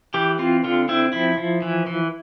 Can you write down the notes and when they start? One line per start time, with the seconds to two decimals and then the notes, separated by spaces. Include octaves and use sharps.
0.14 E3 G4
0.39 C4 F4
0.64 D3 F4
0.89 C4 E4
1.13 F3 E4
1.38 F3
1.62 E3
1.87 E3